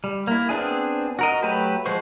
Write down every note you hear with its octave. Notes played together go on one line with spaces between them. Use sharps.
G3
A#3 E4
B3 C4 D4 G#4
F#4 A#4 D#5
F#3 A3 G4 B4
F3 G#3 F#4 C5 C#6